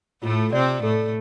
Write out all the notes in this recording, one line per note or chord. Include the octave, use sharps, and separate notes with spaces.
A2 A3 F4
C3 C4 D5
A2 A3 A4